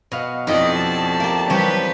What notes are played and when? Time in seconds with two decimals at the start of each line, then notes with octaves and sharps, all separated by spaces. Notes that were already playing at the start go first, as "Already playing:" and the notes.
0.12 B2 D#5 F5 F#5
0.47 F2 D#4 E4 F#4 G4 A4 D5 D#5
0.77 A5
1.20 A#3 G4
1.50 E3 F3 G3 C4 G4 B4 C#5